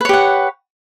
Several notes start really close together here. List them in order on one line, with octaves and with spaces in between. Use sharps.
B4 C#5 G4 F#5